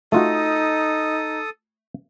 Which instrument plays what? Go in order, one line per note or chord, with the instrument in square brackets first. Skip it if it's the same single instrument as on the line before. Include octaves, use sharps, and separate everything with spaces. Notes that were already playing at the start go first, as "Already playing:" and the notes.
[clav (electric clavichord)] A3 F4 F#4 [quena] D#4 [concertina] A4 D#6